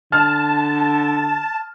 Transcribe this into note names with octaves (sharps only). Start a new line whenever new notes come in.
D3 A5 F6